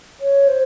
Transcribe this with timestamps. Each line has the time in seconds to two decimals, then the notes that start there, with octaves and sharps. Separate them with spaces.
0.20 C#5
0.48 C5